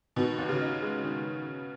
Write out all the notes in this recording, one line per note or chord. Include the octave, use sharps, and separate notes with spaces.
B2 D#3
D#2
C#3
D#4
G#3
D#3